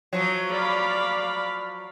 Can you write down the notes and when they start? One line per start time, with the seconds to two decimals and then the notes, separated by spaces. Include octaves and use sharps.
0.13 F3 F#3
0.49 D5 F5 B5